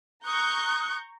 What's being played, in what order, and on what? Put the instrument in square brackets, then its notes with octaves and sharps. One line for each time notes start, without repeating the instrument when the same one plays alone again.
[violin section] A#5 C#6 G6 [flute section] D#6 F#6